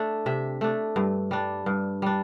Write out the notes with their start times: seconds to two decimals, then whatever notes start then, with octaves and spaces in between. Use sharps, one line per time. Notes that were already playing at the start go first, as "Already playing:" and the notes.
Already playing: A3 D4
0.26 C3 E5
0.61 A3 D4
0.96 G2
1.31 G3 D4
1.66 G2
2.02 G3 D4